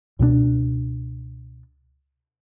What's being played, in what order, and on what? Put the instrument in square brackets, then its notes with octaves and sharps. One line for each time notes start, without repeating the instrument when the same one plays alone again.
[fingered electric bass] C#2 B2 F#3 D4